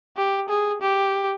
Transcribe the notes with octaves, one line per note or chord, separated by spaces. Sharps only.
G4
G#4
G4